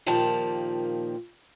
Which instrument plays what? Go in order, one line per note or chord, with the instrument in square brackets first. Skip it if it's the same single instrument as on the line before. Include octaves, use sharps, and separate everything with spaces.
[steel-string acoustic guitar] A#2 D#3 F3 A#3 G4 A5